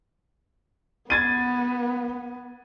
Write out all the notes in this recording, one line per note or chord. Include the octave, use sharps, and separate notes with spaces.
B3 G#6 A6 D#7